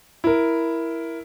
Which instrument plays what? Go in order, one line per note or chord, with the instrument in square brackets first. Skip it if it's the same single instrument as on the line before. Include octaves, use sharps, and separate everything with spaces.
[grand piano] E4 A#4